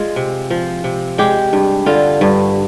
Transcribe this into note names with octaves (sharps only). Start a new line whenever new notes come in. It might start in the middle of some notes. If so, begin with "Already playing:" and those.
Already playing: G#3 F4
C3
F3
C3
G#3 G4
G2
D3 F4
G2